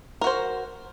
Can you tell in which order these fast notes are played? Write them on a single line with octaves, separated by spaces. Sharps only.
A#4 F#4 C5